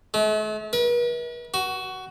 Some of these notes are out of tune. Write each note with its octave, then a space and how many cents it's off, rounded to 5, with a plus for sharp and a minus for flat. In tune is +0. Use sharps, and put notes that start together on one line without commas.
A3 -45
B4 -45
F#4 +15